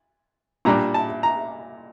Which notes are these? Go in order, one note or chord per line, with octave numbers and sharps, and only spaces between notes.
A#2 G3 D4 A#5
A5
A#5